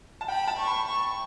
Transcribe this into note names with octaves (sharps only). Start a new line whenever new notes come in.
A5
G5 B5
A5
C#6
B5
C#6